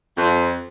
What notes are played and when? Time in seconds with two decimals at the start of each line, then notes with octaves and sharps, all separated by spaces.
0.17 F2